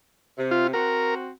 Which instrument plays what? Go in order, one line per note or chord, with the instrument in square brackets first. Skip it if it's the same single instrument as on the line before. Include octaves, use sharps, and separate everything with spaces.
[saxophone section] C3
[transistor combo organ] F4
[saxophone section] C4 F#4 [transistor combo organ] A#4